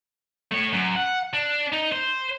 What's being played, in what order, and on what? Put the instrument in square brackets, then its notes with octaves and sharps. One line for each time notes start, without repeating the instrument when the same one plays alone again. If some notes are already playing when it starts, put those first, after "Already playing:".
[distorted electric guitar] A3 C#5
F#2
F#5
D4
D#4
C5